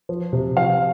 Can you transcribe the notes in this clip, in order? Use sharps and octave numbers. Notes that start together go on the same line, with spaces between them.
F3
C3
F3 F5